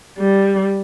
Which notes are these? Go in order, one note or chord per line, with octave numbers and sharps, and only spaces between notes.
G3